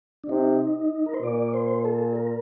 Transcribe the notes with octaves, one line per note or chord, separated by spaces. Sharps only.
D4
C3 D#4
A#4
C5
A#2 D5
C5
A4
A#4